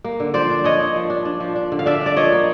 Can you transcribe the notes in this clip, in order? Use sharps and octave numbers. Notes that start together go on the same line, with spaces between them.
A#3
D3
F3 C5 D5
D4
D4 C#5 D#5
D4
F3
D4
D4
F3
D4
D3
F5
D4 D5 E5
D4 D5
F3 C#5 D#5
A#3